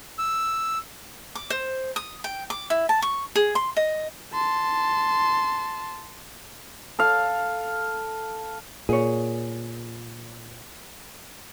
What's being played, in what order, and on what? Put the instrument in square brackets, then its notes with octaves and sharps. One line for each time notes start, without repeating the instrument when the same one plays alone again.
[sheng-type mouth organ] E6
[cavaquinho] D6
C5
D#6
G5
D6
E4
A5
C#6
G#4
C6
D#5
[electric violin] A5 C6
[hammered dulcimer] A4 F5
[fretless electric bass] A#2 [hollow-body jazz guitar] G#4 C#5